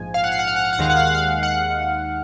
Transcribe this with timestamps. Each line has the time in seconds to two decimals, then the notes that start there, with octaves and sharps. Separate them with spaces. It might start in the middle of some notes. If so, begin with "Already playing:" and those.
Already playing: A#1 G#2 F3 G#5
0.14 F5
0.24 F#5
0.32 F5
0.39 F#5
0.47 F5
0.56 F#5
0.65 F5
0.73 F#5
0.79 D#2 D#3 G#3 F5
0.90 F#5
0.97 F5
1.05 F#5
1.15 F5
1.43 F#5